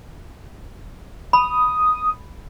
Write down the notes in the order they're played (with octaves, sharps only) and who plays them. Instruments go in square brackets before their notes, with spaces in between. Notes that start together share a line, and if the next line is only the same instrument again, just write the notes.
[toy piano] B5 [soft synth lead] D#6